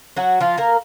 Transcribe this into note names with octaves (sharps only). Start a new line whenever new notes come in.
F#3 F#4
F3 F4
A#3 A#4